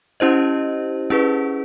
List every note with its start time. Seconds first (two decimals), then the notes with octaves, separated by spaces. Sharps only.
0.20 C#4 E4 G4 C5 D#5
1.10 C#4 E4 G#4 B4